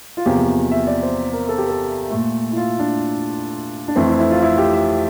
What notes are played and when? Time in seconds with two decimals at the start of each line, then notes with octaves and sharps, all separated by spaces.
0.17 F4
0.26 E2 C3 F3 A#3 G4
0.71 E5
0.87 D5
1.03 C5
1.33 A#4
1.49 A4
1.58 G4
1.69 A4
2.10 A#2 A3
2.52 E4
2.56 F4
2.79 D4
3.88 D4
3.96 F2 E3 A3 C4
4.07 E4
4.19 E4
4.31 F4
4.42 E4
4.58 G4
4.73 E5